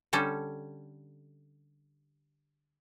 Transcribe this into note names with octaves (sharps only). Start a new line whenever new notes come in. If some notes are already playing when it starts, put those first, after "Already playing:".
D3 G3 C#4 A4